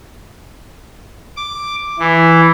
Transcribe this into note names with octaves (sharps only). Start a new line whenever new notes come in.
D6
E3